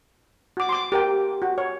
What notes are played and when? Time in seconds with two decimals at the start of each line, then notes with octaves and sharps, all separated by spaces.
0.57 F#4 D6
0.69 C6 D6
0.92 G4 A#4 G5
1.42 F#4
1.58 C#5